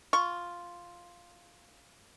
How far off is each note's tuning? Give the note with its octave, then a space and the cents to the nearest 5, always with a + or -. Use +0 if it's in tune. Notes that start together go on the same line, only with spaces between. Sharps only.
F4 +0 C#6 +0